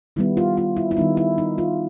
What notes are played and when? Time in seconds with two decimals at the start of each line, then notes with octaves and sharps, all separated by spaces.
0.16 D#3 G3 B3 E4
0.37 F4
0.57 F4
0.77 E4
0.91 E4
0.97 D#3 G3 B3 D#4
1.17 E4
1.38 D#4
1.58 F4